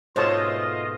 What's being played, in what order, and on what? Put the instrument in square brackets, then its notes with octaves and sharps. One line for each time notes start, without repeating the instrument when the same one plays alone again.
[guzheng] G#2 B2 A3 [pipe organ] F4 D#5 [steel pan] C5 C#5 A5